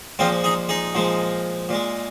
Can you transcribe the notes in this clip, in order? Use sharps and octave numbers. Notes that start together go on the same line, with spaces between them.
A#2 F3 G#3 C4 F4
D#4 G#4
D#4 G#4
A#2 F3 G#3
A#2 G#3